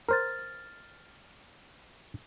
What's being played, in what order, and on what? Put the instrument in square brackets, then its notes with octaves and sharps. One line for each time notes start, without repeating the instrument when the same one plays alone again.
[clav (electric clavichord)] A#4 C5 [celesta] F6 A6